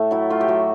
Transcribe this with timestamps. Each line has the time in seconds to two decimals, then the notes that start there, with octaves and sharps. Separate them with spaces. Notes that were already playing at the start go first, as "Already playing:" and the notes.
Already playing: A2 A3
0.11 F#3 E4
0.30 A3 F4
0.41 G4
0.48 F#3 F#4